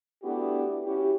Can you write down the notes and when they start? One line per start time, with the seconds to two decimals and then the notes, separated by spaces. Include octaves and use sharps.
0.23 A3 B3 D4 E4 F#4 G4
0.84 C#4 E4 F#4 G4